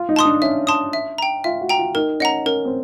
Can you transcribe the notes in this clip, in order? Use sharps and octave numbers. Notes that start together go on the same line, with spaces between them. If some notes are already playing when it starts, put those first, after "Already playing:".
Already playing: F4
D#4
A5 C6 D#6
D4
C#4 E5
A5 C6 D#6
E5
G5 A#5
F4 E5
F#4
G5 A#5
F4
D#4 A#4
C#4 D#5 F#5 A#5
C#4 A#4
C4